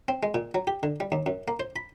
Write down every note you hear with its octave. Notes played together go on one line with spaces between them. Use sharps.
C4
G#3
A#2
F#3
G4
D3
G3
D#2
F#2
A#3
C5
B5